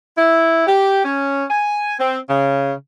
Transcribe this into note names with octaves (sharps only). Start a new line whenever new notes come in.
E4
G4
C#4
G#5
C4
C#3